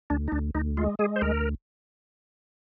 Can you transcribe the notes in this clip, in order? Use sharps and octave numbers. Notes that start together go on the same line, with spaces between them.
D2 D4
D#4
D2 D4
D2 D#4
G#3 F4
G#3 G#4
C5
D2 A#4